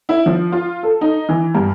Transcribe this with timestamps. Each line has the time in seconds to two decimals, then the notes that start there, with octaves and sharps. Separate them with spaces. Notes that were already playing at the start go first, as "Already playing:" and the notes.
0.09 E4
0.26 F3
0.52 F4
0.83 A4
1.01 D#4
1.29 E3
1.55 G2